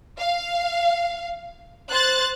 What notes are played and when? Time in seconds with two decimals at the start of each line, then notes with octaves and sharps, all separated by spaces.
0.18 F5
1.89 C5 F#6 A6